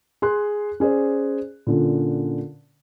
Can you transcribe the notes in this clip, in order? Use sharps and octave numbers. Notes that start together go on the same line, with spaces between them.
G#4 C6 F#6
C#4 G#4 C5 D5
A#2 D3 C#4